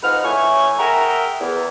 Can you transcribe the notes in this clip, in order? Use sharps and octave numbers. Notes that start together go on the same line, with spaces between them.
F2 G#2 D#4 B4 F#5 F6
A2 E3 E4 C#5 G#5 C#6
G#4 A#4 E5 F#5 G5 A#5
E2